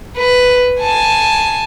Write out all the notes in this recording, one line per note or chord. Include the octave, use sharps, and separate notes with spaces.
B4
G#5 A5